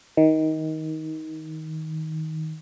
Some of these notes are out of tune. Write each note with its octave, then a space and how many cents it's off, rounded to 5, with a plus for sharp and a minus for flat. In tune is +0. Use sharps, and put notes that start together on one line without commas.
D#3 +20